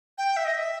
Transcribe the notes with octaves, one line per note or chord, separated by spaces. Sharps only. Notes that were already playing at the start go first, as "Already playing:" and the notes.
G5
E5
D#5
E5